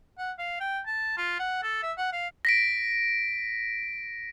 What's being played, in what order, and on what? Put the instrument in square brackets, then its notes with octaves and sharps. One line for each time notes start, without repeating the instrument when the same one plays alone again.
[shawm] F#5
F5
G5
A5
F4
F#5
A4
E5
F#5
F5
[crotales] A#6 B6 D7